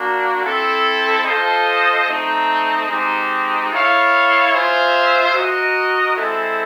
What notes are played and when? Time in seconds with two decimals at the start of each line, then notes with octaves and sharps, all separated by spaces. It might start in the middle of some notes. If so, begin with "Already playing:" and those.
Already playing: A#3 D4 F#4
0.43 C4 E4 A4
1.24 F4 A4 C5 D#5
2.07 A3 C4 D#4
2.88 G#3 C4 D#4 G4
3.71 E4 A4 C#5 F5
4.52 F4 G#4 C5 E5
5.34 F#4 A#4 D#5
6.16 G#3 C4 E4 A4